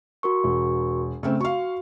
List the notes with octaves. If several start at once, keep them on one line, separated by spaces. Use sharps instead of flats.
F#4 A#4 C#6
E1
C#3 A3 C4
F#4 F5 C#6